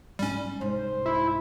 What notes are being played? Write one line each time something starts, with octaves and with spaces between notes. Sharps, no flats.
G#2 G3 C#4
C2 G#2 C5
E4